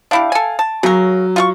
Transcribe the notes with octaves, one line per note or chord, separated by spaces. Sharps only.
D4 E4 G4 F5 D7
A4 G#5
A5
C#3 F#3 A#4
F4 F5 C#6